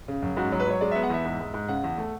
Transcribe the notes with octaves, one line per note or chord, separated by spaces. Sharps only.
C#3
F#2
G#2 F#4
F#3
B4
F#3 C#5
G#3 D5
E5
B3
F#5
E2 E5
G#2
G#2
G#2
C#3 F#5
E2
A3